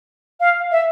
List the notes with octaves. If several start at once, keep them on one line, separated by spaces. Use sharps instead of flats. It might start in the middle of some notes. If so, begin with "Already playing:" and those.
F5
E5